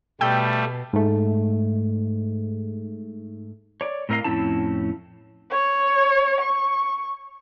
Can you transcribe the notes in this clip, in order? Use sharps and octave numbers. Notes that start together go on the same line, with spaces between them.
B2 G3 A3 G5 E6 G6
G#2 A3
C#5 D5
A2 C4 A#4 D#5 F5
F2 A2 C4 C#4 E4 A5
C#5
C#6